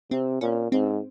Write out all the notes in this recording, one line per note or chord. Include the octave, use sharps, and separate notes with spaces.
C3 C4
A#2 C#4
G#2 C4